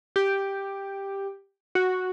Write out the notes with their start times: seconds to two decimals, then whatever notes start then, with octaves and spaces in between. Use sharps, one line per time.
0.16 G4
1.75 F#4